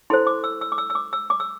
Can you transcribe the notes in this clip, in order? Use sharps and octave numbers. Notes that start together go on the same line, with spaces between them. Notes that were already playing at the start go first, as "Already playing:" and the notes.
E4 A4 C5 C6
D6
E6
E6
D6
E6
E6
D6
E6
D6
E6